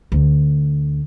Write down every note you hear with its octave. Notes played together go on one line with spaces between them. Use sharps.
D2